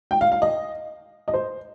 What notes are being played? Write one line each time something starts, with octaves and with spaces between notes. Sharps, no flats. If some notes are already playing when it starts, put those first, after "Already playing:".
G5
F5
F5
D#5
D#5
C5